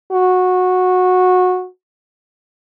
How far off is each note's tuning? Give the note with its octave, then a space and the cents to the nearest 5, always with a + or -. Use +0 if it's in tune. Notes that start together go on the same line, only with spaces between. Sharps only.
F#4 -15